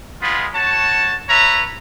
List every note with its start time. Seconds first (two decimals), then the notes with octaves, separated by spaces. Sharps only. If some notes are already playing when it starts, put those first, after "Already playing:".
0.21 G#3 B3 F4 B5
0.54 F#4 C#5 A5
1.29 B4 C#5 E5 A#5